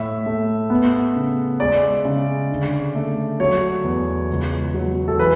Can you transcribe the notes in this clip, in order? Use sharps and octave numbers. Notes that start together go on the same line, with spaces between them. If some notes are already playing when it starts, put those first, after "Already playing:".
Already playing: A2 E5
A3
B3
C#3
G#3 D5
C#3
D3
A3
F#3 C#5
E2
C#2
F#3
A4
E3 B4